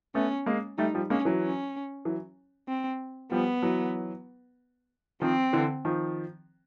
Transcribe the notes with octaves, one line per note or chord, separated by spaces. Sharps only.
A3 B3 C#4
G#3 A#3
G3 A3 D#4
F3 G3
G#3 A#3 C#4
E3 F#3
C#4
E3 F#3
C4
F3 G3 B3
E3 F#3
D#3 F3 C4
D3 E3
D#3 F3